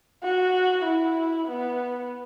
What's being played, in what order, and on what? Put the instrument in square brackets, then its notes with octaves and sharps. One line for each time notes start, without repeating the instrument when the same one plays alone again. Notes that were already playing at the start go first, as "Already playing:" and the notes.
[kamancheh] F#4
E4
B3